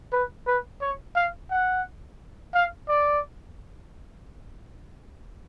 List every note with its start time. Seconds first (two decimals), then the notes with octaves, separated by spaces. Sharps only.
0.12 B4
0.47 B4
0.81 C#5
1.16 F5
1.51 F#5
2.54 F5
2.88 D5